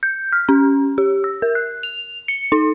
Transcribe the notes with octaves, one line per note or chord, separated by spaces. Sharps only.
G6
F6
C#4
G4
E6
A#4
F#6
F7
C#7
D#4